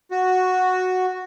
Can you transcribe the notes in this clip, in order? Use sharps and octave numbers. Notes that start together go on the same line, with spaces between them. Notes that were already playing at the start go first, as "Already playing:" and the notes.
F#4